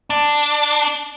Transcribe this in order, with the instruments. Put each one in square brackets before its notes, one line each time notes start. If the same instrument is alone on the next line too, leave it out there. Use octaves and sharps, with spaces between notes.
[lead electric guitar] D4